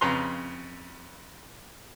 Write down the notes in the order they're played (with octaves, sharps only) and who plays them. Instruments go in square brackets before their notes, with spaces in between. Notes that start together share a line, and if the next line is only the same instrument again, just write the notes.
[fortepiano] F2 C#3 B4 A#5 C6